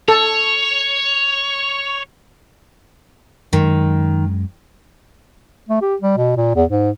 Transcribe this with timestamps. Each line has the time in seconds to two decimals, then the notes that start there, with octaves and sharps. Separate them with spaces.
0.08 A4 C#5
3.53 F#2 D#3 G#3
5.69 A3
5.81 G4
6.01 G3
6.17 B2
6.36 A#2
6.55 E2
6.69 G#2